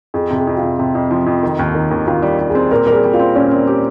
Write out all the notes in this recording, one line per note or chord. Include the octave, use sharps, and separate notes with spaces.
F2 G#4
C3
G#4
F2
F4
C3
C3
F2
F3
F2
D#3
D#2
D#3
D#2
D#2 F4
G3
G3
G#4
C4
A#2 A#4
G3 A#4
G#4
G3
F4
C4
A#2 C#4
C4
G4